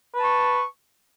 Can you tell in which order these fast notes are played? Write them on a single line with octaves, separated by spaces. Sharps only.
B4 A5 C#6